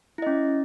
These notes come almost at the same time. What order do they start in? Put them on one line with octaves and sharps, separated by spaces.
E4 D#5 C#4